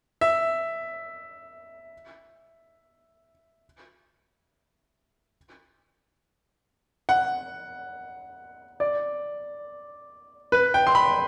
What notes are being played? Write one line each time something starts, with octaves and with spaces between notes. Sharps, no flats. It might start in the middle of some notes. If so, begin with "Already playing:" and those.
E5
F#5
D5
B4
G5
C6
B5